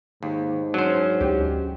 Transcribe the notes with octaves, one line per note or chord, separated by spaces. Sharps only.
D#2 G#2
F#3 C#4 D4 C5
D2 G4